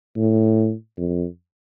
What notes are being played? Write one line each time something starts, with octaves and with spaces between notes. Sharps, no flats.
A2
F2